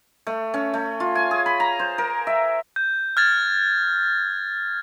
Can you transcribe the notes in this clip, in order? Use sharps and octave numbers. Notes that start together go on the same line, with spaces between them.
A3
C#4
A3
F4
G#5
G#4
B5
A#5
C5
A#4
E5
G6
F6 G#6 A6